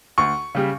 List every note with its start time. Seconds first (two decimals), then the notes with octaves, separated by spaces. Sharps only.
0.18 D2 C#6
0.55 C#3 G3